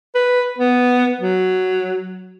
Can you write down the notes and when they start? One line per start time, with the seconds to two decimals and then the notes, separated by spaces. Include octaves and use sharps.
0.15 B4
0.58 B3
1.20 F#3